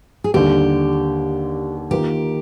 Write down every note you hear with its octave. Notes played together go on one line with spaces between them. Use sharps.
G#4
D#2 D3 G3 G4
D#3 A#3 F4 G4